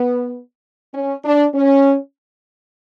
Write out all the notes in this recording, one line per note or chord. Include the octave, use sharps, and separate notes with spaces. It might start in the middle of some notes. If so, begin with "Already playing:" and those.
Already playing: B3
C#4
D4
C#4